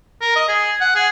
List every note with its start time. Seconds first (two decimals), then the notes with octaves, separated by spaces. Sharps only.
0.21 A#4
0.36 D#5
0.49 G#4
0.81 F#5
0.96 G#4